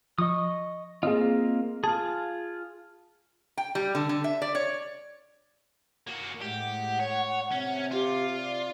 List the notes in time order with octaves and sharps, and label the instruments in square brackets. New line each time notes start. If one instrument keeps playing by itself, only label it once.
[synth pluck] F3 [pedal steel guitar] D#5 C#6 D#6
[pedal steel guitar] A#3 C4 F4 [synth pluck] G#4 D#5
[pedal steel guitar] F4 G#4 [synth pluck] A5
[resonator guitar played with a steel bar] G5
G3
D3
D3
E5
D5
C#5
[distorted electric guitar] A#3 F#4
[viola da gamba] A2 G#3 [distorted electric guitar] G4 [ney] F#5
[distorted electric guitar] C#5
[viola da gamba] C3 [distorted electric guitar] C#4
[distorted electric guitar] F4 [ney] G4
[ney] D5